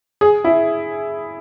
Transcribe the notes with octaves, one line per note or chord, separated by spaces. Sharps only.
G#4
E4